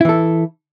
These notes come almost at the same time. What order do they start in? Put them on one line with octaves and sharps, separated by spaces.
E4 E3 A4